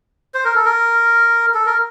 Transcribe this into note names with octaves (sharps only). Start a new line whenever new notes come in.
C5
A#4
A4
A#4
A4
A#4